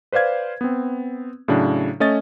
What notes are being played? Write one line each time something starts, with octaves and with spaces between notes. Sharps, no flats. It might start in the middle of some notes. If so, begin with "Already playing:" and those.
B4 C5 D5 F5 G#6
B3 C4
A2 C#3 F#3 D4
A3 C#4 D#5 D#6 A6